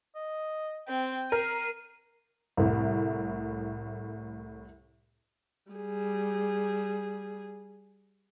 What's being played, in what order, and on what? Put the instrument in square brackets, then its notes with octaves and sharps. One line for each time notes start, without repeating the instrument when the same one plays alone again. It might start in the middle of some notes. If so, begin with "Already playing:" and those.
[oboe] D#5
[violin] C4 [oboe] G5
[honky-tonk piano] A#4 [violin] C7 D#7
[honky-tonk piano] C2 A2
[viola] G3 G#4